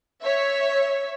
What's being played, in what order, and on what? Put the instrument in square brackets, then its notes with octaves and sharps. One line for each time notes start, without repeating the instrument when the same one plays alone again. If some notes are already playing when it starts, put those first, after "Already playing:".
[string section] C#5 E5